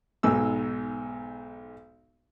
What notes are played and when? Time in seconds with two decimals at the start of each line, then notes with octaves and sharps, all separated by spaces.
0.23 B1 G#2 E6